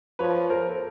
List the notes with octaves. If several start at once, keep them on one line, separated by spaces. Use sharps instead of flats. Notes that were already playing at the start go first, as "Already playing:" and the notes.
F3 B4 C#5
A#4 C5
A4